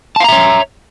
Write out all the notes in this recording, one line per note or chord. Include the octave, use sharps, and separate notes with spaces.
C#5 E5 F5 A5 A#5